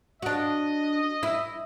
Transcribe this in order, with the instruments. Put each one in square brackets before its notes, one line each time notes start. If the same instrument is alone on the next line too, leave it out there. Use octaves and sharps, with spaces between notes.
[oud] D4 F#4 [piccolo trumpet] D#5
[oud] E4